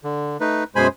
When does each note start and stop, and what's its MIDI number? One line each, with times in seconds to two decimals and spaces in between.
0.04 0.37 50
0.40 0.64 57
0.40 0.64 63
0.40 0.64 71
0.76 0.88 42
0.76 0.87 47
0.76 0.88 56
0.76 0.88 72
0.76 0.87 80
0.76 0.87 83